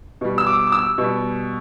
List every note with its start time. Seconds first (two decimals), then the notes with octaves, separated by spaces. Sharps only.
0.21 B2 G3
0.38 E6
0.47 D6
0.67 D6
0.72 E6
0.98 B2 G3